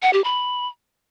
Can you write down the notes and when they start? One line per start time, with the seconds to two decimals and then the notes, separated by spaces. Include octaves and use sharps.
0.02 F#5
0.13 G4
0.24 B5